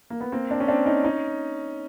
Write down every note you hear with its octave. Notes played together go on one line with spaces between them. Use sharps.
A#3
B3
A#3 C4
C4 D4
C#4
C4 D4
C#4 D#4
C#4 D#4